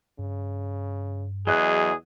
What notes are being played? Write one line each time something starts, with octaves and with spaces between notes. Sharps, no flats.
G2 C#3
E2 F#3 G#4 D#5 F#6